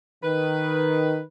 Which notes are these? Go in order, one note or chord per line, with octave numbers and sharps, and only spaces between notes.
D#3 B4